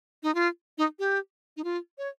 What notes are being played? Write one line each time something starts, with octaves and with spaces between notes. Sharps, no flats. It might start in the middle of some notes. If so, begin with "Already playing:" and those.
D#4
F4
D#4
G4
D#4
F4
C#5